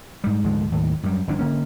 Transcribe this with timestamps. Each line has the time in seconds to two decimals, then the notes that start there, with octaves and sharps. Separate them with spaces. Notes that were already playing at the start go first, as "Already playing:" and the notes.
0.24 G#2 G3
0.44 D2 G#2 F3 G#3
0.72 D#2 A2
1.03 F#2 G3
1.27 G1 F3 D4
1.39 D3 A#3 C#4